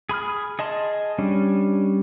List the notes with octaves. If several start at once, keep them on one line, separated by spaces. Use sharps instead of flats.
G#4 B5 D#6 F6
G#4 D#5 A5 C6
G3 C#4 D4